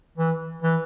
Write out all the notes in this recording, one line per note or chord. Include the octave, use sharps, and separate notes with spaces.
E3
E3